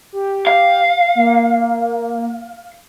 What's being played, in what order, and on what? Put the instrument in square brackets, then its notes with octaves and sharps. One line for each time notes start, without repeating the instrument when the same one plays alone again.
[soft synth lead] G4
[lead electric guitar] F5
[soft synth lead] A#3